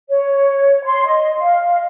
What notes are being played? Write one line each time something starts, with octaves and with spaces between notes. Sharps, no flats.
C#5
C6
D#5
F5